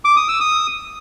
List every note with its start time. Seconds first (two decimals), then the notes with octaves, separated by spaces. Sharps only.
0.05 D6
0.17 D#6
0.28 E6
0.40 D#6